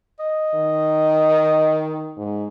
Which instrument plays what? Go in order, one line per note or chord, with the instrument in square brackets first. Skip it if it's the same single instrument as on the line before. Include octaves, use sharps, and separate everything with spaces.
[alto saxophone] D#5
[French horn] D#3
G#2